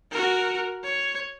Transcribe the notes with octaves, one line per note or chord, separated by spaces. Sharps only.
F#4 A#4
C#5